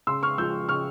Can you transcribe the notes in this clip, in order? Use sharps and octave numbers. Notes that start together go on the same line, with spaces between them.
C#3 C6 E6
C#6 F6
F3 G#3 E6 G6
C#3 C#6 F6